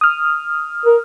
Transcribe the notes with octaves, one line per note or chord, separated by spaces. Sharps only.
D#6 F6
A#4